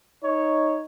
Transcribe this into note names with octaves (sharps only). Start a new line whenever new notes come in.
D#4 C#5